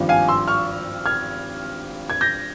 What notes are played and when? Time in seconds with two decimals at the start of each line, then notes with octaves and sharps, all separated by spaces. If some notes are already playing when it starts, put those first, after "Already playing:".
Already playing: G#1 G2 F3
0.09 F5 G#5
0.28 C6 E6
0.48 C#6 F6
1.06 F6 G#6
2.10 G#6
2.21 G6 A#6